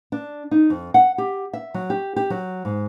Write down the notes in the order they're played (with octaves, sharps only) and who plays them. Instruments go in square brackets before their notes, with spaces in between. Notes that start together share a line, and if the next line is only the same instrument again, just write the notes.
[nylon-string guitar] D4
D#4
F2
F#5
G4
E5
F#3
G4
G4
F#3
G#2